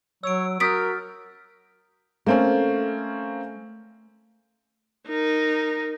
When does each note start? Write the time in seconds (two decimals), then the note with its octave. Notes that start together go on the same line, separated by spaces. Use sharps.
0.24 F#3 C#5 E6 D7
0.60 F#4 A#4 D#6 F6 G6 A6 B6 D7
2.26 A3 A#3 C4 C#4
5.08 D#4 A#4